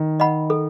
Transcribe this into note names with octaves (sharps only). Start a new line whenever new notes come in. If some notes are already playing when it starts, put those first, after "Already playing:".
Already playing: D#3
D#5 F#5 B5
A4